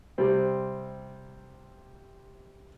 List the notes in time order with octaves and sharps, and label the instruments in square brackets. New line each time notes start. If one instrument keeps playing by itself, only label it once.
[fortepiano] C3 G3 C4